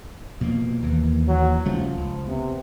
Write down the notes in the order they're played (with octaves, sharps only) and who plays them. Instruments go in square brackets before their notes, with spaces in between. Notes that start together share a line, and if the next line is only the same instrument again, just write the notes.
[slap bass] B2 F3 A#3
D#2 E3 A#3
[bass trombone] F#3
[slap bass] C#3 G3 A3 [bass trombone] F3
[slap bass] C#2
[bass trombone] C3 [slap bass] B3